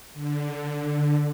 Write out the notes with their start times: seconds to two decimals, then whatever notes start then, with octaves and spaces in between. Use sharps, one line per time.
0.14 D3